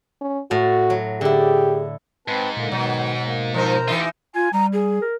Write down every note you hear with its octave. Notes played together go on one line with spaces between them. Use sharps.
C#4
A2 F#4
F#3
D3 E4 G4 G#4
G#2 C4 B4 A5
A#2 D3 A#3
B2 D#3 F#3 B3
A#3
F3 C4 D#4 A#4 C5 A#5
E3 D#4 F4 G4 E5
F4 G#5
G3 A#5
G#4
A#4